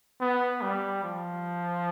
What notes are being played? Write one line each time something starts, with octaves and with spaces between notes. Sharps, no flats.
B3
G3
F3